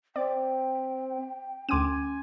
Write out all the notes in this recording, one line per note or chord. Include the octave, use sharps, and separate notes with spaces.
C4 D5 G5
D2 C#4 G#5 C6 D6 D#7